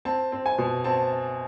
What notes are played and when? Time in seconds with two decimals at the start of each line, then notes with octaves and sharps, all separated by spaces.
0.05 C4 A5
0.32 C4
0.46 G#5
0.58 B2
0.84 C4 A5